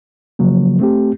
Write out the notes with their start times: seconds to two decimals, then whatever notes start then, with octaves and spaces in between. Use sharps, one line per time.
0.39 C#3 F3 F#3 A#3
0.80 A3 C4 G4